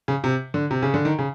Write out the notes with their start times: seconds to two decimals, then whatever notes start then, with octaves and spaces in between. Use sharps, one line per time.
0.08 C#3
0.24 C3
0.54 D3
0.71 C3
0.82 C#3
0.94 D3
1.05 D#3
1.19 C#3